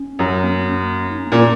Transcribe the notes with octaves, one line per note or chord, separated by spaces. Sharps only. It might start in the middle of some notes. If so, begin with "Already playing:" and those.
Already playing: C#4
F#2
A#3
C#4
A#3
D#4
C#4
A#3
A#2 C#4